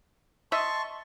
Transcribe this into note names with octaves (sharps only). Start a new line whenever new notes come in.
D#5 E5 A5 C6 C#6